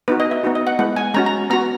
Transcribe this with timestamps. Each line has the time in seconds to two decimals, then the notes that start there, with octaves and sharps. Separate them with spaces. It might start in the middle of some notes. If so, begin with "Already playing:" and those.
0.08 B3 D#4 F#4 B4
0.20 D#5
0.31 E5
0.43 B3 D#4 F#4
0.55 D#5
0.67 F#5
0.79 G#3 B3 E4 F#5
0.96 G#5
1.14 G#3 C#4 F#4 A#5
1.26 A#5
1.50 B3 F#4 A#5